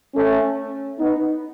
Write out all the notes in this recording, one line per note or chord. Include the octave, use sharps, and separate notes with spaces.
A3 C#4
B3 D#4